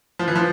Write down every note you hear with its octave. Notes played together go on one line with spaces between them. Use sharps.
F3
E3
F3